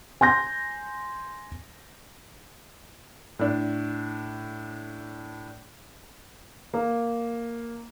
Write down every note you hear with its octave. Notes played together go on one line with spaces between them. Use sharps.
G#5 C6 G6 A#6
A2 D4
A#3